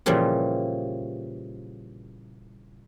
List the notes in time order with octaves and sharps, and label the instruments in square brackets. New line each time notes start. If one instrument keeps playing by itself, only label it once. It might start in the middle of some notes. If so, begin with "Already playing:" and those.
[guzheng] A#2 C#3 E3 F3 G3